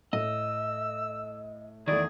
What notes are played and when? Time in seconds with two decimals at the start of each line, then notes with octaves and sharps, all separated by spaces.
0.13 A2 D#5 E6
1.88 E2 D#3 A3 E4 G#4 D5